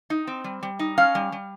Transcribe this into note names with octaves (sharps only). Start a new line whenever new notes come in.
D#4
C4
G3
G3
D#4
C#4 F5
G3
G3